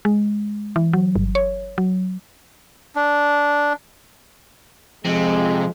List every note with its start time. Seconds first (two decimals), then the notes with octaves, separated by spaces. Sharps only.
0.05 G#3
0.76 E3
0.93 F#3
1.16 G1
1.35 C#5
1.78 F#3
2.96 D4
5.05 F2 C3 F3 G#3